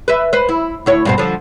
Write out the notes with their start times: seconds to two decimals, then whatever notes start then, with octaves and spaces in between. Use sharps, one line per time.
0.08 B4 E5
0.33 B4 C5
0.49 E4
0.86 D2 E4 C#5
1.05 G2 B2 C4
1.18 D3 F3